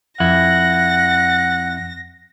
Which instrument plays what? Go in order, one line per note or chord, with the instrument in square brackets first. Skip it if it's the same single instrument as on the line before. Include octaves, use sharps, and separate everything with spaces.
[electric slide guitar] F2 E4 [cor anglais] F#5 [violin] A#6